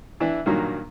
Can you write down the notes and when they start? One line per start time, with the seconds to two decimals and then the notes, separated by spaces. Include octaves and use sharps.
0.20 E3 D4 E4
0.46 G2 A#2 D#3 F#3 A#3